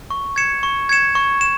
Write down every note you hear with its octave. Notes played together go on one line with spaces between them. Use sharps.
C#6
G#6 C#7 E7
C#6
G#6 C#7 E7
C#6
E7